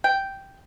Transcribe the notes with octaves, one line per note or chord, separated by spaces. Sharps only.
G5